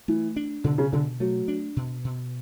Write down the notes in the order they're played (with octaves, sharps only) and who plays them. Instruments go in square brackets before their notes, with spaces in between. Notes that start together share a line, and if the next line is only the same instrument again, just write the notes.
[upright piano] E3 [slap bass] A3
[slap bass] D4
[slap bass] B2 [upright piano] D3
[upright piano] C#3
[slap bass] B2 [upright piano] D3
[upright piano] F#3 [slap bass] A3
[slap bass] D4
B2
B2